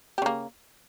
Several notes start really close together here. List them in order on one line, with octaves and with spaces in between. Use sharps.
G4 C#3 A#3